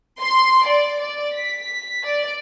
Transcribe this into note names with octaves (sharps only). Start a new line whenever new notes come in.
C6
D5
D5
B6
D5